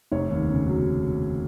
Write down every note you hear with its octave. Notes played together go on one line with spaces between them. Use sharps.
F1 C#5
D#2
C#3
F#3